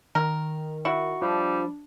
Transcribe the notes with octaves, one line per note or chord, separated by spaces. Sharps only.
D#3 A#4
E4 F#4 C#6
F3 G3 D4